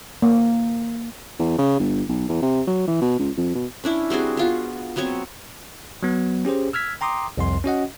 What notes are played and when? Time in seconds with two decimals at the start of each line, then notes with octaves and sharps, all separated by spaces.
0.22 A#3
1.39 E2
1.58 C#3
1.79 G1
2.09 B1
2.29 E2
2.42 C3
2.67 F#3
2.87 E3
3.01 B2
3.19 C#2
3.37 F2
3.55 B2
3.84 C#4 D4 E4
4.10 G3 C4 F#4 G#4
4.37 B3 F4 F#4
4.96 F#3 B3 C4 C#5
6.03 F#3 B3
6.45 C#4 G4 G#4 C5
6.73 E6 F6 G#6 B6
7.01 G5 A#5 C6 D6 D#6
7.37 C2 F2 C6
7.64 C#4 F#4 D#5 F#5